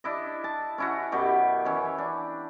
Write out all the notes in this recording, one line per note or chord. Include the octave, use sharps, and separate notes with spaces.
D4 E4 D#5
A5
C#4 E4 F#4
F#2 B2 G4 C#5
E3 C#4 C#5
D4